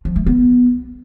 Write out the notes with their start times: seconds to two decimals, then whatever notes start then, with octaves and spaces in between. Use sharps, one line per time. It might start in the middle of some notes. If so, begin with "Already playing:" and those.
0.05 F3
0.16 A3
0.26 B3